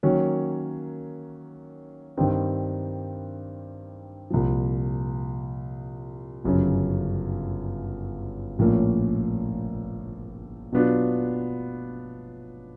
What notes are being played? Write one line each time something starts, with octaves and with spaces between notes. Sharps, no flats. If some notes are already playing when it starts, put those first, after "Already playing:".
D#3 F#3 A#3 C#4
G2 D#3 G3 C4 D#4
C2 A#2 F3
G1 F#2 C#3 F#3
A#1 A2 F3 A#3 C#4
B2 F#3 B3 D4 F4